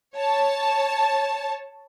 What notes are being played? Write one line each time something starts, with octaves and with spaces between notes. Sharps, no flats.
C#5 A5